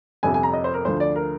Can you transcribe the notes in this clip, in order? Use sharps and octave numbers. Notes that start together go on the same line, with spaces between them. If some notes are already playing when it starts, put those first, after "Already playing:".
G1 F2 C3 G#5
G#5
A#5
D#5
C5
A#4
D2 D3 F3 C5
D5
A#4